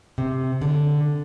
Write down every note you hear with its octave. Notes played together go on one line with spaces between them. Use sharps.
C3
D3